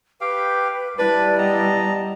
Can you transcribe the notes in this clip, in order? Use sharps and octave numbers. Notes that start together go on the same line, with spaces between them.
G4 B4 F5 G5
G3 D4 E4 B4 D5
B3 D#5 A5 A#5